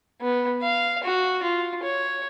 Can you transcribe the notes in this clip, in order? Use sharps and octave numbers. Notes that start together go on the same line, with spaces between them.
B3
F5
F#4
F4
C#5